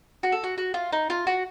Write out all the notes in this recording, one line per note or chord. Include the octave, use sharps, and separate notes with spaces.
F#4
A4
F#4
F#4
F4
D#4
F4
F#4